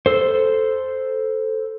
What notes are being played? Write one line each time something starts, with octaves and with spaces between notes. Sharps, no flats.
A4 C5